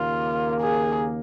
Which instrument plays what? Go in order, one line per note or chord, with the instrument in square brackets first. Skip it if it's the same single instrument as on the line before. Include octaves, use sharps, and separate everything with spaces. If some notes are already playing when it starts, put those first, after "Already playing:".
Already playing: [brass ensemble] D#2 C#3 A#3 [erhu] F4
[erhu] G#4